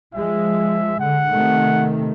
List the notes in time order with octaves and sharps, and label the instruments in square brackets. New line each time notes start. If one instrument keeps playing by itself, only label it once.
[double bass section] F3 G#3 [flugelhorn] E5
[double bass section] D3 [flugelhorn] F#5
[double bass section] C3 D#3 A3